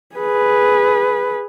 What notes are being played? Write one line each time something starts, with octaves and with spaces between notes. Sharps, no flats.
G#4 B4